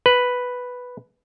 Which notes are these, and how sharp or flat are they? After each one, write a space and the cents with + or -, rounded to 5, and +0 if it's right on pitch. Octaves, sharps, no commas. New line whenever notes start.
B4 +0